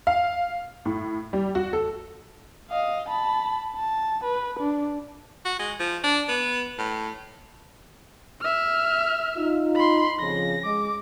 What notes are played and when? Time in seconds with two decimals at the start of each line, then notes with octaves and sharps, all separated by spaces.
0.07 F5
0.85 A2
1.33 G3
1.55 F#4
1.73 A4
2.70 D#5 F5
3.09 A5 B5
3.76 A5
4.24 B4
4.60 D4
5.45 F#4
5.59 G#3
5.80 F3
6.04 D4
6.29 B3
6.79 A2
8.41 E5 F6
9.37 D#4 F4
9.76 B5 C6
10.20 F2 C#3 F3 A#6
10.65 G#3 D6